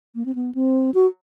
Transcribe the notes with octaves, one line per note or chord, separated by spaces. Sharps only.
A#3
C4
B3
C4
F#4